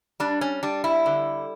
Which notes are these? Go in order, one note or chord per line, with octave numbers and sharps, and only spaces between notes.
G3 D4
C#4
G3 D4
E4
D3